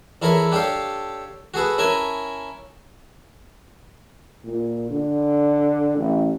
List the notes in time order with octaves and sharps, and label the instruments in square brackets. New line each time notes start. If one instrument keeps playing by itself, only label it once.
[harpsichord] E2 E4 A4 A#4 C#5 B5
D4 G4 A4 C#5 F5
F#4 G#4 A4 B4
C#4 E4 A#4 G#5 A5
[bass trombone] A#2
D3
A1